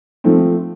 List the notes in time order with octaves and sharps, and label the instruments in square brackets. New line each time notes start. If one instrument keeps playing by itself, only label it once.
[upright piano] F3 A3 C4